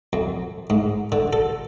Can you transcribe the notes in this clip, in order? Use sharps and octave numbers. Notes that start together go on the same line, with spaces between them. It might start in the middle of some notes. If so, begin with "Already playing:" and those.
F2
G#2
D3
A4